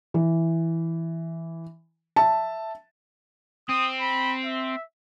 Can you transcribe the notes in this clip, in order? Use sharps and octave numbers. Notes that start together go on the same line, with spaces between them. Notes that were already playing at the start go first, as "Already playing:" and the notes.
E3
E5 A5
C4 D#6
B5
E5